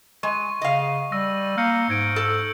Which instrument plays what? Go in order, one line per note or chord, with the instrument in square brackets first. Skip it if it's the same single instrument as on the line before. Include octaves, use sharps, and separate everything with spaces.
[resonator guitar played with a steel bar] G#3 [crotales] C#6 D#7
[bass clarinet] C#3 [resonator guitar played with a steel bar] D#5 F5
[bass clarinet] G3 [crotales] C#6 E6 A#6
[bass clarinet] A#3 [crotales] F6 G6 C#7
[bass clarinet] G#2 [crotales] G#6 D7
[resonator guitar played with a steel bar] A4 [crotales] E6